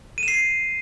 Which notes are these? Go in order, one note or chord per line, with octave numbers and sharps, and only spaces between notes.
D#7
E7
C7